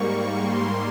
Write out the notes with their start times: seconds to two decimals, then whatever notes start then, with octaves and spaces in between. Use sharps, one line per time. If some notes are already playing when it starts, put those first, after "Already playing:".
Already playing: G#2 G3 A#3 C#6
0.40 G#2 G3 A#3 C6